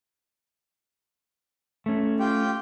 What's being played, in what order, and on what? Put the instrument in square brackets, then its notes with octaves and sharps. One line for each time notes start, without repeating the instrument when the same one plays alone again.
[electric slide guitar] A3 C#4
[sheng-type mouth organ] F4 G4 G5